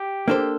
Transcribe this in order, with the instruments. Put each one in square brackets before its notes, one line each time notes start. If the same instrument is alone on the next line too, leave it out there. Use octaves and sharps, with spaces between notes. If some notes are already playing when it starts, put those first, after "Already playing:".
Already playing: [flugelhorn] G4
[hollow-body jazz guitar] A#3 D4 A4 C5